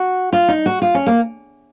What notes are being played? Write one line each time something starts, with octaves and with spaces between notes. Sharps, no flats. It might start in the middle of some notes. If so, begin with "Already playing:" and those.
Already playing: F#4
F4
D#4
F#4
F4
C#4
A#3